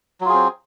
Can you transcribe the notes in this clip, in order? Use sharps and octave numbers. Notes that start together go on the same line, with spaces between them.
F#3 C4 F4 G#4